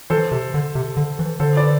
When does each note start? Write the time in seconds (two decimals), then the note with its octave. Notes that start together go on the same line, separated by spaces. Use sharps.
0.10 E3 A4 C5
0.32 C3
0.54 D3
0.75 C3
0.97 D3
1.19 E3
1.40 D3 A4 C5
1.56 B4 D5